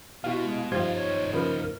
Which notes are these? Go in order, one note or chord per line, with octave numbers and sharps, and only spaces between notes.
B2 E4 F#4 G4 F5
G#3
G2 F3 G3 D#4 F4 C5 F5 G#6
C#5
C#3 F3 A#4 B4